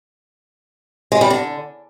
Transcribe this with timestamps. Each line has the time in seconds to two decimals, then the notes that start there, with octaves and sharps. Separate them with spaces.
1.12 G#3
1.21 G3
1.30 D3